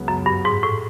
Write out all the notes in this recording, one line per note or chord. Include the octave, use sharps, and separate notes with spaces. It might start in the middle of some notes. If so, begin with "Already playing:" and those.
Already playing: C#2 C#3 F#3 B3
F#2
G2
G#2
A2